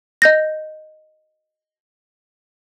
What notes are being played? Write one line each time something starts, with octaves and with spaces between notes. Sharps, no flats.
D#5 G6 A#6